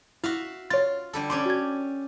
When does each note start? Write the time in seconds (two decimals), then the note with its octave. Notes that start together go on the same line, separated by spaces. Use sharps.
0.24 E4 F#4 E5 F5
0.70 F4 C#5 A6
1.13 D3 G3 A4
1.30 C#4 G4 D5 C6
1.46 F#4 G#6